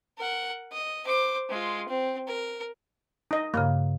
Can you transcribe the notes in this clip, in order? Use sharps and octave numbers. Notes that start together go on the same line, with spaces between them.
A#4 F#5
D#5
C5 D6
G#3 F4
C4
A#4
D#4 D#5
G2 C#3 A#3